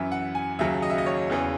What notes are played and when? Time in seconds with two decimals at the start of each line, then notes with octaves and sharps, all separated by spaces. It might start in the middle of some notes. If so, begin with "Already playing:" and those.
Already playing: F#2 E3 E5
0.12 F#5
0.35 G#5
0.59 D#2 C#3 F#3 E5
0.82 D#5
0.90 E5
0.98 D#5
1.06 C#5
1.30 E2 C#3 E3